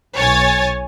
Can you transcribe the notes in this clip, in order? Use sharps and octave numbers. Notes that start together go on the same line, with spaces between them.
B1 C#5 G#5 A6